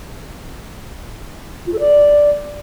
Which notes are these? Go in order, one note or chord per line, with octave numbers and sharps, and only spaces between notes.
F4
A4
D5